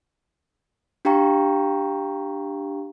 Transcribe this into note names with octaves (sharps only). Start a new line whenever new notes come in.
D4 G4 F5 G5 A#5 C#6